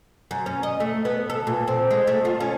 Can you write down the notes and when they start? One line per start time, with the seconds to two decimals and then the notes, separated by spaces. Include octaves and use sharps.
0.31 F#2
0.46 C#4
0.63 D#5
0.80 A3
1.05 B3
1.30 A4
1.47 A#2
1.68 C4
1.91 G#3
2.07 A3
2.25 F4
2.40 C#4